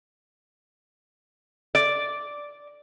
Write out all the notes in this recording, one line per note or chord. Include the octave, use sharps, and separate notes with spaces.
D5